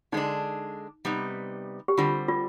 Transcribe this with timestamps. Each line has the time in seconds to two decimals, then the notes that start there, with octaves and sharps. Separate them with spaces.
0.12 D3 G#3 D4 D#4
1.05 C3 G3 B3 D#4
1.88 G4
1.98 D3 G3 C4 F4
2.28 F4